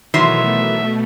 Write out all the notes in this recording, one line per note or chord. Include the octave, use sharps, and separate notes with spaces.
B2 D#3 E3 F#3 A3 E5 C6